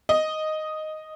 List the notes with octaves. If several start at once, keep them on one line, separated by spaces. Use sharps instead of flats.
D#5